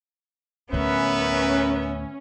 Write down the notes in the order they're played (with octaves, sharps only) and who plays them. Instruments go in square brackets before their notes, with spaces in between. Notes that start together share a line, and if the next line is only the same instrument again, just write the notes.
[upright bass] D2 A2 [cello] B3 E5 [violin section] C#4 [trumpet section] A#4 B4